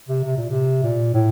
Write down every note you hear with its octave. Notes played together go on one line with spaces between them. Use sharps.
C3
C3
A#2
C3
A#2
A2